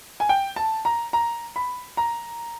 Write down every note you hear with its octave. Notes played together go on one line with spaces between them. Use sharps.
G#5
G5
A5
A#5
A#5
B5
A#5